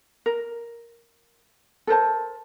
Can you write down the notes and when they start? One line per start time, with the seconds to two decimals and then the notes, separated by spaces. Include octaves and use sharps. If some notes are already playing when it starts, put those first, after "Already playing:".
0.26 A#4
1.87 A4 A#4 C5 A5